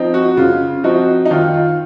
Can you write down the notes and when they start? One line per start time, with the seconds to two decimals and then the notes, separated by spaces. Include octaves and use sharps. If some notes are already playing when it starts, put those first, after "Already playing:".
Already playing: F3 C4 D#4
0.14 F#4
0.37 C#3 F4
0.84 F3 C4 D#4 F#4
1.26 D#4
1.31 D#3 F4
1.54 F4